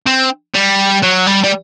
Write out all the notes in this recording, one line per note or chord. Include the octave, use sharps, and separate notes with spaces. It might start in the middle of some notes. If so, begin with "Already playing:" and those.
C4
G3
F#3
G3
G3